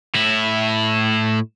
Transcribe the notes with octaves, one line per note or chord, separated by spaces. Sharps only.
A2 E4